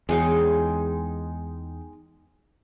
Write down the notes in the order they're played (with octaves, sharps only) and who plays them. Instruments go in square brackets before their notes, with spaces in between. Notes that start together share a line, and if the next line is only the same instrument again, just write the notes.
[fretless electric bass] E2 F#3 [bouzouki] G#3 D#4 G5